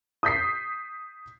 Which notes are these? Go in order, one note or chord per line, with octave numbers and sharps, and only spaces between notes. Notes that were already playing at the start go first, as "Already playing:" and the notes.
D#6 G6 B6 C7